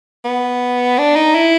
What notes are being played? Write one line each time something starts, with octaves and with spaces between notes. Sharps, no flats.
B3
D4
D#4
E4